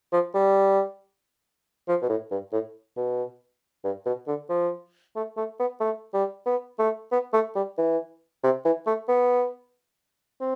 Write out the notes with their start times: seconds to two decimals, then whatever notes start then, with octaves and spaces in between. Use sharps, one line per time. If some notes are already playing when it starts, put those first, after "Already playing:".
0.13 F3
0.34 G3
1.88 F3
2.02 B2
2.09 A2
2.31 G2
2.52 A2
2.97 B2
3.84 G2
4.06 B2
4.27 D3
4.49 F3
5.16 A3
5.37 A3
5.59 B3
5.80 A3
6.14 G3
6.46 B3
6.79 A3
7.12 B3
7.33 A3
7.55 G3
7.78 E3
8.43 C3
8.65 E3
8.87 A3
9.08 B3
10.40 C4